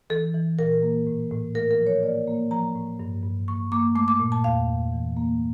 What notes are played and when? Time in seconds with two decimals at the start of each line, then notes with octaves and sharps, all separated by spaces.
0.10 E3 A4
0.34 E3
0.59 A#2 A#4
0.83 A#3
1.07 A2
1.31 A2
1.55 A3 A#4
1.71 A#4
1.79 F3
1.87 C#5
2.03 A#3 D5
2.28 A#3
2.51 F3 A#5
2.75 A2
3.00 G2
3.23 G2
3.48 A#3 C#6
3.72 A#3 D6
3.95 A3 D6
4.08 D6
4.19 A#2
4.32 A5
4.44 E2 F5
4.68 E2
4.92 E3
5.16 A#3